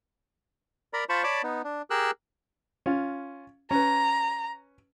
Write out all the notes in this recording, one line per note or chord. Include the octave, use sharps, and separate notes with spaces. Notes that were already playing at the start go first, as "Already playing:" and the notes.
A#4 D5 A#5 B5
F4 C5 A5 B5 C#6
C#5 D5 A5 B5 D6
B3 D#4
D4
G4 G#4 A#4 E6 F#6
C#4 F4
C#4 B4 A#5